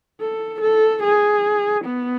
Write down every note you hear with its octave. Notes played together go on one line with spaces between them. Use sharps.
A4
A4
G#4
B3